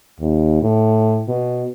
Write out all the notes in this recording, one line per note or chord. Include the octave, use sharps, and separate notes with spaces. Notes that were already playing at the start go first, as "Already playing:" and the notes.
D#2
A2
B2